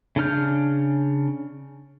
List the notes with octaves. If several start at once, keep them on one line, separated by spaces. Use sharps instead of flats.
C#3 D4 F6 G6